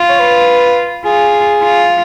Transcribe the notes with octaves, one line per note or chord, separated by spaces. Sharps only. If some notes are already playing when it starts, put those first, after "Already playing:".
Already playing: F4
C#5
B4
F4 G#4
F4